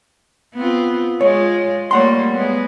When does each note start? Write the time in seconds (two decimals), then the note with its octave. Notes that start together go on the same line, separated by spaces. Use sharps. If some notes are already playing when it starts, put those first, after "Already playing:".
0.54 B3 C4 F4
1.21 G#3 F4 C#5
1.91 G3 A3 A#3 C#5 F#5 C6
2.34 G#3 B3